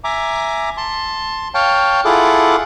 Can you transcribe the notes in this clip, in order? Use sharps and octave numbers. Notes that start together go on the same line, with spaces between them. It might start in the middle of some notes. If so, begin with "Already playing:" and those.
E5 G#5 A#5 D6
A5 C6
C#5 F5 G5 A5
E4 F4 G#4 A4 F#5 D6